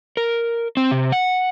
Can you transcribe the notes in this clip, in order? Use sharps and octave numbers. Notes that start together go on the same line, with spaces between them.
A#4
C4
C3
F#5